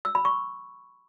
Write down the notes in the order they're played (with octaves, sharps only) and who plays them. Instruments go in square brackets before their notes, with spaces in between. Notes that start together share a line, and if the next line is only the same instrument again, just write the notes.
[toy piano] E6
B5
C#6